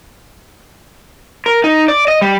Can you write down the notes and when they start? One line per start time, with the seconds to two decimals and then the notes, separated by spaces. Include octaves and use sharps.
1.46 A#4
1.64 D#4
1.88 D5
2.08 D#5
2.22 G3